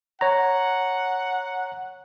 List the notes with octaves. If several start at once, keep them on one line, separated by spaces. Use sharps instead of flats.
C#5 F#5 A#5